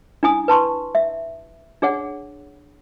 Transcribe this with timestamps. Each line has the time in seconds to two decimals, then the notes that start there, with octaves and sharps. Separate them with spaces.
0.23 D4 E4 G#5 D#6
0.48 B4 A5 C6 C#6
0.95 E5
1.82 D4 G#4 C#5 F#5